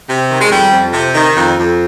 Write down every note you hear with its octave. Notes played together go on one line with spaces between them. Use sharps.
C3
D#3
G#3
F2 G3
F2
C3
D#3
F2
F2